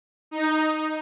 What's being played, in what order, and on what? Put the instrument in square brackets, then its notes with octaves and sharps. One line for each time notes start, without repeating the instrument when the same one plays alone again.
[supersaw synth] D#4